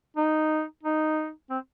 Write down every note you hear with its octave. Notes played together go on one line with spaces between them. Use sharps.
D#4
D#4
C4